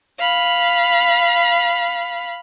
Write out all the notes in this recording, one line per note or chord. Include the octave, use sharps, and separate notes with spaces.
F5 B5